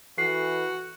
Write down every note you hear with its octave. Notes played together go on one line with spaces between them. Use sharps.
E3 F#4 A4 F#5 C7